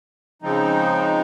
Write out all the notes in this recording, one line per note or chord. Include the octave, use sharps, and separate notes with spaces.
C#3 F3 G#3 C4 D#4